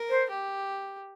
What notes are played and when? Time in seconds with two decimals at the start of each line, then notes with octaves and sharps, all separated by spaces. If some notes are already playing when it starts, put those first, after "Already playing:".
Already playing: A#4
0.10 C5
0.29 G4